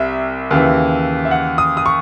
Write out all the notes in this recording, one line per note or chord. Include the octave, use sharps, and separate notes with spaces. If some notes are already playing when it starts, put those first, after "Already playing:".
Already playing: C2 E5
D#2 C#3 E3
E5
F#5
D#6
D#6
C#6